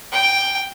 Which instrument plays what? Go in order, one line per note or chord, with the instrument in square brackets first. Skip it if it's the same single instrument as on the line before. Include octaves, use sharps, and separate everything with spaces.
[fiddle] G5